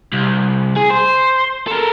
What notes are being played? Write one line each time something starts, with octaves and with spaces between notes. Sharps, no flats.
C2
G#4
C5
A4 A#4